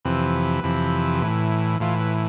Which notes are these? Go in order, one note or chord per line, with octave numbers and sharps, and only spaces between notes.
F2 C3 E3 B4
F2 C3 E3
A2 E3
A2 E3 F4
B4